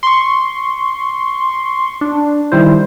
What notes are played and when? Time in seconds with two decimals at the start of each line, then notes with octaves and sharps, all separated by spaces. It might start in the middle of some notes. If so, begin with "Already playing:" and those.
0.03 C6 C#6
2.01 D4
2.52 D#3 G3 E4 C5